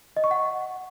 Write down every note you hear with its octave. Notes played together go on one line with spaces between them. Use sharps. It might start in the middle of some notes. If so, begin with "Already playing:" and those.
D#5
C#6
F#5